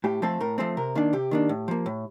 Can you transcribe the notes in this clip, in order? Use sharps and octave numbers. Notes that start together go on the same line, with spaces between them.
A2 G4
F3 A3 C4 A4
A2 A#4
F3 A3 C4 C5
C3 A#4
D#3 A#3 D4
C3 G4
D#3 A#3 D4
A2
F3 A#3
A2